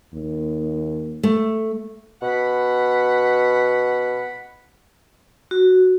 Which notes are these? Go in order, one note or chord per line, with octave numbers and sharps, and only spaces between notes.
D#2
A3
B2 F#5 B5
F#4